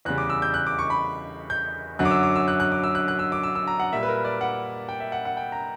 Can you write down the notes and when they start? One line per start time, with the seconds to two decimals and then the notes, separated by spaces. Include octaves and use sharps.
0.05 E2 C#3 G3 F#6
0.18 D6
0.30 E6
0.42 G6
0.54 F#6
0.67 D6
0.79 C#6
0.90 B5
1.50 G6
1.99 F#2 D3 F#3 F#6
2.05 D6
2.11 E6
2.23 D6
2.36 E6
2.48 F#6
2.60 F#6
2.72 D6
2.84 E6
2.95 F#6
3.08 F#6
3.19 E6
3.32 D6
3.43 E6
3.55 E6
3.67 A#5
3.80 F#5
3.93 A#2 G3 E5
4.03 B4
4.09 A#4
4.24 D5
4.41 F#5
4.89 G5
5.00 E5
5.12 F#5
5.25 F#5
5.37 G5
5.52 A#5